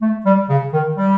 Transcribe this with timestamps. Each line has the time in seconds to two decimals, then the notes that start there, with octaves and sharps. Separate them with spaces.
0.01 A3
0.25 G3
0.49 C#3
0.73 D#3
0.96 G3